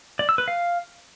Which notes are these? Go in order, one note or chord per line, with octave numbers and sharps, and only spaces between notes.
D5
E6
B4
F5